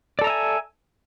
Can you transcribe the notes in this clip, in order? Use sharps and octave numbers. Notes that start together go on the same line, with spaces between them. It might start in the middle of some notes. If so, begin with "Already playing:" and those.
A4 D5 E5 G#5 A#5